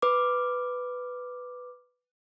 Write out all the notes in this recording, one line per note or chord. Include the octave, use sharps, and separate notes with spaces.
B4 D6